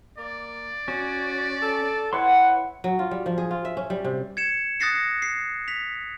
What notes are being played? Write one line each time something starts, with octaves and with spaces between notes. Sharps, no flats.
A#3 D5
C#4 F#4
A4
E4 B4 C#5 F#5 C6
F#3
F4
G3
F3
G#4
F4
E5
C#4
G3
C3
G#6 C#7 E7
D#6 F#6 A6 A#6 C7 C#7
C7
B6 F7